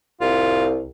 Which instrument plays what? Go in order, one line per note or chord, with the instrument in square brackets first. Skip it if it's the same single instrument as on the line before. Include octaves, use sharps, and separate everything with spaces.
[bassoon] C2 [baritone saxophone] F4